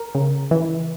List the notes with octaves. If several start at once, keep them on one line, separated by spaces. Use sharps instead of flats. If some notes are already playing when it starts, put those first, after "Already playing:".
Already playing: A#4
C#3
E3